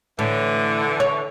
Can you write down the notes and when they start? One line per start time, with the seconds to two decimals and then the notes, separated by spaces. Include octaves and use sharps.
0.19 A2 D3 E3
1.00 C#5